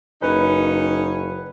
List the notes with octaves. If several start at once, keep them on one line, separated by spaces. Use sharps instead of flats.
F#1 C#4 D#4 B4